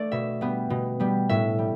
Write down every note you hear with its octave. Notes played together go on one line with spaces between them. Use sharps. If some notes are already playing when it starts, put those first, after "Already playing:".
Already playing: A3 D5
B2 E5
G3 B3
B2
G3 B3
A2 E5
G3